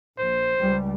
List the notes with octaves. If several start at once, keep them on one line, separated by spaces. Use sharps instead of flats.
A#1 C5
C#2 G3